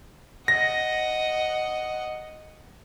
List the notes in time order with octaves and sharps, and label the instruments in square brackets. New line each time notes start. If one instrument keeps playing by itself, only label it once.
[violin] D#5 F#5 [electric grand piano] A#6